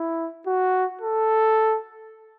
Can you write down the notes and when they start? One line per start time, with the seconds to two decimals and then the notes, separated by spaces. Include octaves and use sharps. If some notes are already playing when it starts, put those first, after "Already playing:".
Already playing: E4
0.47 F#4
1.01 A4